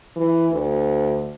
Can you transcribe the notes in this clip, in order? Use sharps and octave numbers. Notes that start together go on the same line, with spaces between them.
E3
D2